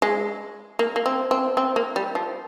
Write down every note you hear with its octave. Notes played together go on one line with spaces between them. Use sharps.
G#3
A#3
A#3
C4
C4
C4
A#3
G3
F3